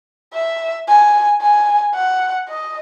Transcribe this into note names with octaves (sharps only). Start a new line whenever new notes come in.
E5
G#5
G#5
F#5
D#5